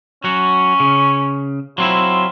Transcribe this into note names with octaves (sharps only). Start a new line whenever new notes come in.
F#3 C#4 F#4
C#3
F#3 C4 E4 F4